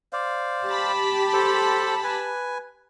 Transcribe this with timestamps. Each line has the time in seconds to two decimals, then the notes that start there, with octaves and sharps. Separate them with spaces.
0.13 C5 D5 F5
0.67 G4 A5 B5
1.33 A4 C5
2.04 B4 G#5